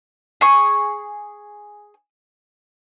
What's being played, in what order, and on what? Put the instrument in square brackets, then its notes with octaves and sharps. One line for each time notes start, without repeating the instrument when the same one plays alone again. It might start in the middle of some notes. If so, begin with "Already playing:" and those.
[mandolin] G#4 C#6